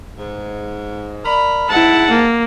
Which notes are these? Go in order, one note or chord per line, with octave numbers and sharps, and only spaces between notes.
G#2
A#4 D5 B5
G#2 E4 F#5 A5
A#3